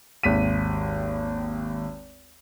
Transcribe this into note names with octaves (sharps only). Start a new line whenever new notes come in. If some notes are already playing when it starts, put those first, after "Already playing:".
G#1 D#2 B6 D#7